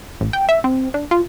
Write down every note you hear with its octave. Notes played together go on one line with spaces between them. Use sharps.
A1
G5
E5
C4
D4
F4